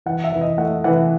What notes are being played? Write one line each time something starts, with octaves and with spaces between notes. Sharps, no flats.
E3 F#5
E5
E3
D#5
A3 F#5
E3 F#5